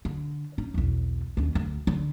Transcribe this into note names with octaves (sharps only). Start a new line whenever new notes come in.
D3
C#4 D#4
B1 E2
D#2 C#4
D2
D3